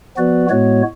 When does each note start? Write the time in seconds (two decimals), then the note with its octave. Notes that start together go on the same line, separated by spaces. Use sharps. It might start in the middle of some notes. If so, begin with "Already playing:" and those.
0.17 F3 B3 F#4 B4 D5
0.50 A2 G#3 B3 F#4 C#5